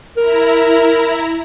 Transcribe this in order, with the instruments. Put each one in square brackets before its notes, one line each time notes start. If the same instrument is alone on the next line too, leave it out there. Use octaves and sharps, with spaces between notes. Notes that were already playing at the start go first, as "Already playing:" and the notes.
[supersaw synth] E4 A#5 [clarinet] A#4